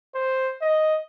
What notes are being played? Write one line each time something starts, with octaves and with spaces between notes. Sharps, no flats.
C5
D#5